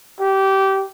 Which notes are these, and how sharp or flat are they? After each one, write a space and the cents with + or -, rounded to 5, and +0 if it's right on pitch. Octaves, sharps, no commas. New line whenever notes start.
G4 -20